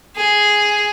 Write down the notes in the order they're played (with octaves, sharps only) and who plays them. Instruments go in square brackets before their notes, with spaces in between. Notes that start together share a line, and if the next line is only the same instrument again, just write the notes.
[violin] G#4